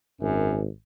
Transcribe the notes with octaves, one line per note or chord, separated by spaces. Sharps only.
G#1 F#2